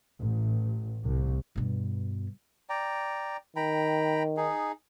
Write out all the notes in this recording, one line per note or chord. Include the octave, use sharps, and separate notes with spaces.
A1
C2
G2 B2
D5 G5 A#5
D#3 G5 A#5 B5
D#4 G#4